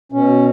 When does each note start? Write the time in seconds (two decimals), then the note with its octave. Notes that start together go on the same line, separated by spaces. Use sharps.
0.12 B2 C#4